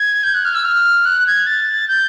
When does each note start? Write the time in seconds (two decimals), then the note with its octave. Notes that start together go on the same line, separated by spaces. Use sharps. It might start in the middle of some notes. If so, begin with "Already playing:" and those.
Already playing: G#6
0.23 G6
0.34 F#6
0.45 F6
0.55 E6
0.65 F6
1.05 F#6
1.27 G#6
1.47 A6
1.88 G6